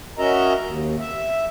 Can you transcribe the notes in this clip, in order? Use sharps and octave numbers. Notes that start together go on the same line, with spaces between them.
C#4 F#4 A#4 D#5 E5 A#5
D#2
E5